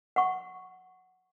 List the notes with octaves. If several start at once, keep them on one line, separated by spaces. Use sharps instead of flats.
F#5 C#6